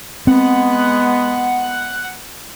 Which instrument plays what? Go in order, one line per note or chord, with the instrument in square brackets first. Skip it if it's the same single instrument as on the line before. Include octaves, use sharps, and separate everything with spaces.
[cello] G#3 B3 [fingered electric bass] C4 [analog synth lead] F#5